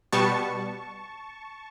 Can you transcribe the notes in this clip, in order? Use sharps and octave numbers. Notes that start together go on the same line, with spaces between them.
B2 G3 B3 A5 C#6